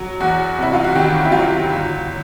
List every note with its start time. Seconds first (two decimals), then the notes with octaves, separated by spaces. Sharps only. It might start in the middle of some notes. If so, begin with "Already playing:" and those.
Already playing: F#3
0.20 E2 F#4
0.58 C3 E4
0.73 F4
0.84 F#4
0.95 D#3 G4
1.25 E4
1.32 F#3 F4
1.70 G1